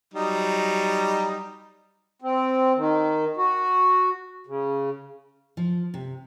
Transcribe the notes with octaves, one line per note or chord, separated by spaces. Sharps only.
F#3 G3 D#4
C4
D#3
F#4
C#3
F3
C3